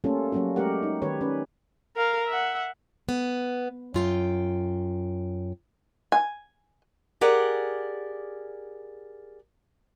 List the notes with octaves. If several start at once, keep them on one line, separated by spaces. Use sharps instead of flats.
G3 A3 A#3 C#4 F4 A4
F#3 G3 A#3 C#4 F#4
G#3 A3 G4 A#4 F#5
D#4
D#3 G3 G4 B4 C#5
C#4 B4
A#4 F5
E5 F#5
B3
F#2 F4 G5
G#5
G4 G#4 A#4 D5 F#5